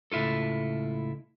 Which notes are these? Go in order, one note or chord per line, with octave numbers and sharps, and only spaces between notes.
C#2 A2 E4 F4 A4